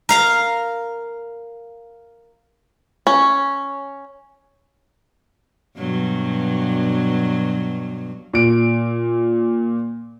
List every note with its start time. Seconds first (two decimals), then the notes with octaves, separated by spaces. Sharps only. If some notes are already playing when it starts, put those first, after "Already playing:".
0.09 A#4 F5 A#5
3.07 C#4
5.77 G2 B2 F#3
8.34 A#2 D7